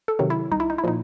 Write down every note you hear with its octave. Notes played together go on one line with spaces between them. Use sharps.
A4
C3 D#3 F#3
E4
C2 D#4
E4
D#4
E4
A#2 F3 D#4